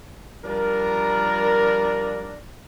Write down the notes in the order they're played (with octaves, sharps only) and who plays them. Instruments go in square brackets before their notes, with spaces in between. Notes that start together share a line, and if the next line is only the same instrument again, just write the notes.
[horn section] F3 G3 D4 A#4